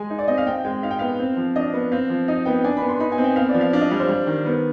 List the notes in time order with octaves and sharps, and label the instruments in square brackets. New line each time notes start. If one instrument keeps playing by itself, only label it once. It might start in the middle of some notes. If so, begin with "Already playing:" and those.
Already playing: [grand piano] G#3 [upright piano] G#5
[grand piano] D#4
[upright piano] D5
[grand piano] C4 [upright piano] D#5
[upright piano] F5
[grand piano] C4 [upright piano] G5
[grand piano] G#3 [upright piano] G5
[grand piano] D#4 [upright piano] F5
[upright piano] G5
[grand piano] B3 [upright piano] F5
[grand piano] C4
F3
[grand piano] D4 [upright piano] D#5
[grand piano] B3
[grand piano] C4 [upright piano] F5
[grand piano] F3
[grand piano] D#4 [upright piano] D#5
[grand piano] B3 [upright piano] G5
[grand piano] D4 [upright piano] G#5
[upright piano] B5
[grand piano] B3
[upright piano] C6
[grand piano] D#4 [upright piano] B5
[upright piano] G#5
[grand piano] C4
[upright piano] G5
[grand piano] B3 [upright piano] F5
[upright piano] D5
[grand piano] F3
[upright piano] F5
[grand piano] D4 [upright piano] F5
[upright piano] D#5
[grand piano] G3 [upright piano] F5
[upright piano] C5
[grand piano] G3
D#3
B3